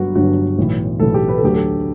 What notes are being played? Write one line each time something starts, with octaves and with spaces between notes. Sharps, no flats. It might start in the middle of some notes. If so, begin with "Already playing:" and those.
Already playing: G1 G2 D3 F#3 F#4
G1 G2 D3 F#3 F#4
B1 A2 E3
B1 A2 E3 A4
G4
B4
A4
D2 D3 F#3 G4
A4